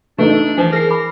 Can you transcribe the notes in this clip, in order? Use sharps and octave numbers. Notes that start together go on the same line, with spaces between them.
A3 D4 D#4 B4
E3 F3 G#5
G#4 A#4 C7
B5 D6